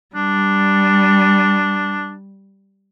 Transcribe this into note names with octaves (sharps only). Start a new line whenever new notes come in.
G3 D4